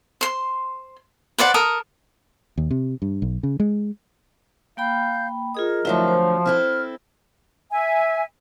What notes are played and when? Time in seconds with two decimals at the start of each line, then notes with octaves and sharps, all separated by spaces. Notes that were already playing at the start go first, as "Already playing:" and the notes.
0.21 C5 C6
1.38 B4 C5 D5 F#5
1.54 A4 A#4 D#6
2.58 D#2
2.71 C3
3.02 G2
3.22 B1
3.43 C#3
3.60 G#3
4.77 A#3 F5 G5 B5 G6
5.55 F4 G#4 A#4 D#5 D#6
5.85 D3 F3 F#3 A3 E4 E5
6.08 C5
6.46 C4 E4 A4 F6
7.71 E5 G#5